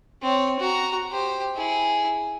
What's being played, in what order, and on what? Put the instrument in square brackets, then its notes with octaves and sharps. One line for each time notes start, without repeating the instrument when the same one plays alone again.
[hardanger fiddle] C4 C#5
F#4 A#5
G4 C5
E4 G#4